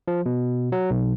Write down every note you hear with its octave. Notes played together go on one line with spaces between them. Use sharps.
F3
B2
F#3
B1